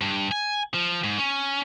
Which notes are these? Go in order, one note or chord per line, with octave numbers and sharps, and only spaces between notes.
G2
G#5
F3
G#2
C#4